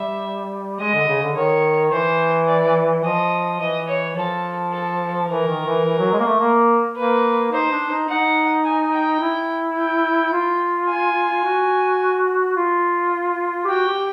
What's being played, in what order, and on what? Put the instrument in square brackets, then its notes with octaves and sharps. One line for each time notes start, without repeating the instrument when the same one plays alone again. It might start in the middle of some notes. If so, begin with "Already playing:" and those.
Already playing: [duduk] G3 [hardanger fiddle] E5
[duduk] G#3 [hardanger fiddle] D#5
[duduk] D3
C#3
D3
[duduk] D#3 [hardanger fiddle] C#5
[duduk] E3 [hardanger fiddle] C5
[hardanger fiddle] D5
[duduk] F3 [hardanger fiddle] D#5
[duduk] E3 [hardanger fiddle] D#5
[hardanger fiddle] C#5
[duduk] F3 [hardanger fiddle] A4
[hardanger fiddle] A4
[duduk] E3 [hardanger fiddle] A#4
[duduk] D#3
E3
E3
F#3
G#3
A#3
A3
A#3
[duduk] A#3 [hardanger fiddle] B4
[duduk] D#4 [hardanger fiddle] C5
[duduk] D4
D#4
[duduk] D#4 [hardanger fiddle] F#5
[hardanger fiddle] G#5
G5
[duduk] E4
[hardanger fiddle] G5
[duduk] F4
[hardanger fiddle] G#5
[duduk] F#4
F4
G4
[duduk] F#4 [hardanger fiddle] G5
[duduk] G4